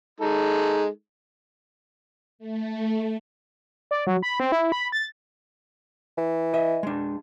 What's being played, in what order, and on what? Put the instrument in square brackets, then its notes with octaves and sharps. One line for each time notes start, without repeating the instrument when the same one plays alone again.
[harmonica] G#3 D#4 A4
[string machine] A3
[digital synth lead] D5
F#3
B5
C4
E4
B5
A6
[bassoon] E3
[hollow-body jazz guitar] D#5 E5
G#3 D4